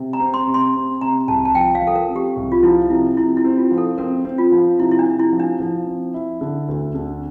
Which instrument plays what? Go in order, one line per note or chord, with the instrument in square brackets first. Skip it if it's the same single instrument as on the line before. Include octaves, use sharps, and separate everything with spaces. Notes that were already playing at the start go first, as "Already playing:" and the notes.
Already playing: [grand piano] C3
[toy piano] A#5
[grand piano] C4
[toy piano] C6
[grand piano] C3
[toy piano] C6
[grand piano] C4
[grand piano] C3 [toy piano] A#5
[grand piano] C2 [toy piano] A5
[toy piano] A5
[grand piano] F3 [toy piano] G5
[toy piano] F5
[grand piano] F3
[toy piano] A4
A#4
[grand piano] C4
[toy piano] G4
[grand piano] C2
[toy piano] F4
[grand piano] F3 [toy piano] E4
[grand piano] C3 [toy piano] E4
[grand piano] C3 [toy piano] E4
[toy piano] E4
[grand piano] C4
[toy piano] F4
[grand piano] F3
[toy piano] A4
[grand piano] C4 [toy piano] A#4
[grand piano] C4
[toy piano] F4
[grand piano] F3
[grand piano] C3 [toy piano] E4
[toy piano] E4
D4
[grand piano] C3
[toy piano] E4
[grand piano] F3
[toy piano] D4
[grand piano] F3
C4
E4
D3
D2
D3